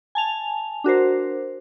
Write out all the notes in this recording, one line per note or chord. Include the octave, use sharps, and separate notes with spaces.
G#5 A5 F7
D4 F#4 A#4 C5